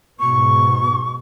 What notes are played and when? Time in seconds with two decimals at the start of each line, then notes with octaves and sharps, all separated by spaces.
0.19 G#2 B2 C#6